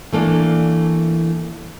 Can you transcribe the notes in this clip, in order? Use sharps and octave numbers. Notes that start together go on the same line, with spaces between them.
E3 A3 A#3 D4